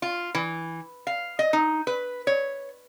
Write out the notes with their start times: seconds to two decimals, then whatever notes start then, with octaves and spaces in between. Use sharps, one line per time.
0.02 F4
0.35 E3
1.07 F5
1.39 D#5
1.53 D#4
1.87 B4
2.27 C#5